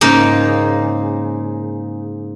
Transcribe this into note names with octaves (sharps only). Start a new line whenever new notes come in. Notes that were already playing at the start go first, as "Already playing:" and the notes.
G#2 C#3 A#3 D#4